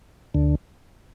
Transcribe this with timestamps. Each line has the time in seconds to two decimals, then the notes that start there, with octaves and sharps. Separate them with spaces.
0.34 D2 D3